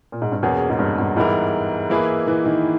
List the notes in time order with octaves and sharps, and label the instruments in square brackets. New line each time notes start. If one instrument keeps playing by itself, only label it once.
[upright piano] A#2
G#2
G2
[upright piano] E2 [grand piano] B2 A#3 C#4 G#4
[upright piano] G#2
G2
G2
[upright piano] G#2 [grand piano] E3 G3 B3 E4 A#4
[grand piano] E3 A#3 E4 G#4 B4
[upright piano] E3
D#3